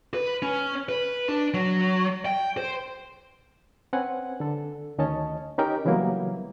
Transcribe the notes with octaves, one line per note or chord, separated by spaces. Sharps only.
B4
C#4
B4
D4
F#3
G5
C5
C4 C#4 B4 F#5 G#5
D3 A4
D2 D#3 C#4 C#5 D#5 A5
C#4 D#4 G4 A#4 G5 A#5
C#3 E3 F#3 G3 A#3 B3